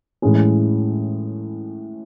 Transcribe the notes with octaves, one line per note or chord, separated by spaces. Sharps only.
A2 E3 G#3 C#4